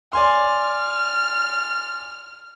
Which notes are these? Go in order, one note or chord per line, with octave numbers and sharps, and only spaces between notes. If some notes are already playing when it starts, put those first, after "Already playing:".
D5 G#5 C6 F6